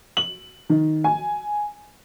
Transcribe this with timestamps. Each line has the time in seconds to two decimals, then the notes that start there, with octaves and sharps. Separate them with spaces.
0.17 F#7
0.69 D#3
1.04 G#5